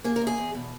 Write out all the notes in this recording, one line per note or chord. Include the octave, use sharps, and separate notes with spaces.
A#3 G#4
A#4
E2
G#4
E2
B2